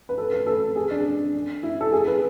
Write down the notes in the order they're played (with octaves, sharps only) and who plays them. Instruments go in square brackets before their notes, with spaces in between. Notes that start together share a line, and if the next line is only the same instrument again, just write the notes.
[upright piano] B4
A4
B4
A4
G#4
D4
E4
A4
G#4
B4